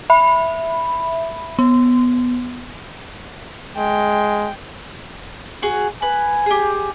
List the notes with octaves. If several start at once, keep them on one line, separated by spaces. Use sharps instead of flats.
E5 B5
B3
G#3 G5
F#4 G#4
B4 G#5
G4 G#4